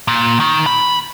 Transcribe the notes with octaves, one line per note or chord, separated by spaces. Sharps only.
A#2
D#3
B5